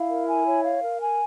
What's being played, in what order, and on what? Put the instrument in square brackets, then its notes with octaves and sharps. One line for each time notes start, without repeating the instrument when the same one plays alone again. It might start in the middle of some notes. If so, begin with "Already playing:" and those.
Already playing: [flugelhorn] E4 [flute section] F5
[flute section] A#4
G#5
C#5
F5
A#4
G#5